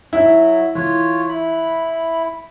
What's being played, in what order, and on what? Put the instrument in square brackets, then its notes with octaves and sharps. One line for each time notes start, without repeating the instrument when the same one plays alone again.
[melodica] F#3 [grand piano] E4
[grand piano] E3 [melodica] F4 C#5
[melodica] E4 B5